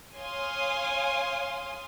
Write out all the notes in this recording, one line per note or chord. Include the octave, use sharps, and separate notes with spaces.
C#5 F5 G#5 C6 D#6